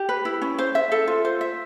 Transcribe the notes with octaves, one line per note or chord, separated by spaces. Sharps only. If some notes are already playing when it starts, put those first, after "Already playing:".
Already playing: G4
B4
E4
C#4
C5
E5
A4
F4
C5
E5